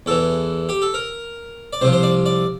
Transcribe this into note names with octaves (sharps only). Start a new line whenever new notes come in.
E2 E3 A4
G4
A4
A#4
D5
C2 C3 F3 C5
C5
D5
D5